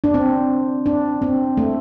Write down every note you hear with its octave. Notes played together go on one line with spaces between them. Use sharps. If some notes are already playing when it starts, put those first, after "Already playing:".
D4
C4
D4
C4
A3